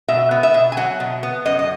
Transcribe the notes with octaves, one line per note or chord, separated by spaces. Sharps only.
B2 E5
B3
E5
B2
G#5
F#3 F#5
B2
B3
F#2 D#5
D#5